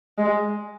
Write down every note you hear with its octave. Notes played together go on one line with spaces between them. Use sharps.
G#3